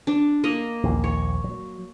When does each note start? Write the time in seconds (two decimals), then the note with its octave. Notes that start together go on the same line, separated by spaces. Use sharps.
0.07 D4
0.44 A#3 D#5
0.83 A#1 D#2
1.04 C#5
1.44 F#3